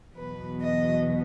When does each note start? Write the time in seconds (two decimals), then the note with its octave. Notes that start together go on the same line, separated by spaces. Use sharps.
0.15 E2 B2 F#3 B3 B4
0.61 D#5